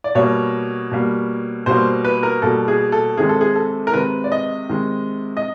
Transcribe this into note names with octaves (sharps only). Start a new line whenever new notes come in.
D5
B2 G3 A#3 C#5
B2 G3 A#3
B2 G3 A#3 C5
B4
A#4
B2 G3 A#3 A4
G#4
A4
C3 D#3 G#3 G#4
A4
G#4
A4
A#4
C3 D#3 G#3 B4
D5
D#5
C3 D#3 G#3
D#5